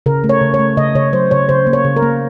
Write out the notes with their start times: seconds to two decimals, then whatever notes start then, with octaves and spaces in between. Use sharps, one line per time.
0.06 C#3 A#4
0.24 A3
0.29 C#5
0.41 C#3
0.54 C#5
0.59 A3
0.77 C#3 D#5
0.95 C#3 C#5
1.13 F#3 C5
1.31 C#3 C#5
1.49 C#3 C5
1.67 A#3
1.73 C#5
1.85 C#3
1.96 A#4
2.02 A#3